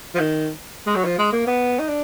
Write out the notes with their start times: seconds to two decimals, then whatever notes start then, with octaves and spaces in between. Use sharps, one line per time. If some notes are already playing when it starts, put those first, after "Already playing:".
0.15 F3
0.19 D#3
0.87 G#3
0.96 F#3
1.05 F3
1.19 G#3
1.33 A#3
1.47 B3
1.79 D#4
1.89 D4